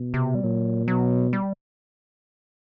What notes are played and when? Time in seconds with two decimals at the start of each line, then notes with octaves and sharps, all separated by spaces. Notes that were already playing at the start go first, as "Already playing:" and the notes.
Already playing: B2
0.14 C3
0.35 G3
0.43 A#2 F#3
0.88 B2 F#3
1.33 G3